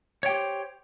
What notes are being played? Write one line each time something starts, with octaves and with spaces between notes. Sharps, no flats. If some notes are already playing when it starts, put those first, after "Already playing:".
G4 C5 C#5 G5